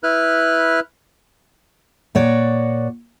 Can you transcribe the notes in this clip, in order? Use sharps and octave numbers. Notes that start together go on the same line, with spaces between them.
E4 B4 F6 F#6
A#2 F#4 C#5 D5